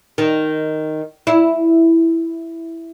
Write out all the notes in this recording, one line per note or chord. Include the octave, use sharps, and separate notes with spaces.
D#3
E4